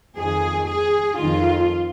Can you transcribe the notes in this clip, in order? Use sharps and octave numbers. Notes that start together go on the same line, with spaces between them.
F2 D#3 G#4
G#4
F2 D#3 F4